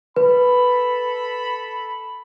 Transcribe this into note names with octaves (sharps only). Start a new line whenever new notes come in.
A4 B4 B5